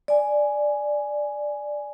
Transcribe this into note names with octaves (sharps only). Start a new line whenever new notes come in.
D5 G#5